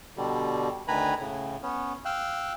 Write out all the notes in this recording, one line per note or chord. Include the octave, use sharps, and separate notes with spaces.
B2 D3 G3
D2 D#3 B4 G#5 A#5 B5
A2 C#3
B3 C#4
F5 G5 E6 F#6